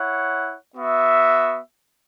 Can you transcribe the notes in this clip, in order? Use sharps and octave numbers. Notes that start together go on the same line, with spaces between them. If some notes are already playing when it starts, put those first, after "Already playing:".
Already playing: E4 C#5 F#5
B3 F#4 E5